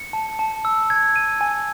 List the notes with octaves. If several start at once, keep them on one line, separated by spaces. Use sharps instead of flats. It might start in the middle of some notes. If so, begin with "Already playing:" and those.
Already playing: C#7
A5
A5
E6
G#6
D#7
G#5